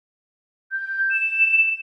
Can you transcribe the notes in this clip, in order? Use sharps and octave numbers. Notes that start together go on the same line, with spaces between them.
G6
E7